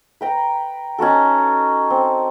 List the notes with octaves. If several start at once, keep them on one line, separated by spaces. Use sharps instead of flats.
B4 G5 A#5
C#4 D#4 F#4 A4
C4